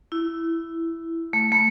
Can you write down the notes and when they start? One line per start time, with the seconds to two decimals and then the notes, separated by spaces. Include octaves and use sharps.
0.12 E4
1.33 A3
1.52 A3